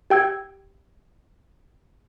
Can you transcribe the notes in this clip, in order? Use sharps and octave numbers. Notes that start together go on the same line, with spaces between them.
G4 G5 E6 G#6